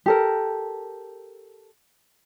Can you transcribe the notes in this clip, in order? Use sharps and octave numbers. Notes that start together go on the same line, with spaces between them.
G4 A4 A#4